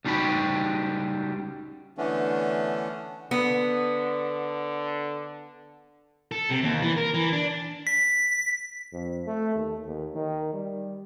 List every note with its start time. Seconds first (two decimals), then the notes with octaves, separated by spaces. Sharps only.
0.05 C#2 G3 D#4 F#4 G4 B5
1.98 D3 E3 A3 B3 C#4 D4
3.31 D3 B3
6.32 A4
6.50 C3
6.63 D#2
6.82 E3
6.97 A#4
7.14 E3
7.33 D4
7.87 B6
8.93 F2
9.27 A3
9.55 D#2
9.85 D#2
10.15 D#3
10.53 G3